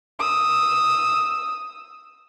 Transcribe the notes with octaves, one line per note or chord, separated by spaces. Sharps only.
D#6 E6